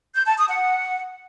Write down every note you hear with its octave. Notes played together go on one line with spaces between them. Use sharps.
G6
A5
D#6
F#5